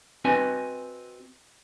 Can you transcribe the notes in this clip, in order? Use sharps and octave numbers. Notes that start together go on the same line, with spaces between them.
C4 F#4 B4 D#5 G#5